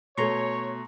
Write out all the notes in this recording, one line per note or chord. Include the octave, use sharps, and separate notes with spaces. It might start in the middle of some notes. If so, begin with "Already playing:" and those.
B2 A3 C#5 A#5 C6 C#6